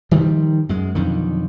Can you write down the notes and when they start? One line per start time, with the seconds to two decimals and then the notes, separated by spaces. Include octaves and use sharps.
0.11 D#3 F3 G3
0.69 F#2 G#3
0.95 B1 F2 D3 D#3